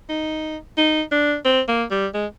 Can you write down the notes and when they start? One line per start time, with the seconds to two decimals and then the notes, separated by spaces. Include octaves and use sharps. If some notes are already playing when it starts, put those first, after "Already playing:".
0.09 D#4
0.78 D#4
1.12 D4
1.45 C4
1.68 A#3
1.91 G3
2.14 G#3